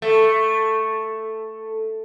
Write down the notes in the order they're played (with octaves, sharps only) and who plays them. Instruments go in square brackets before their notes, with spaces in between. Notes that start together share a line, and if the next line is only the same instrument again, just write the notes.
[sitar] A3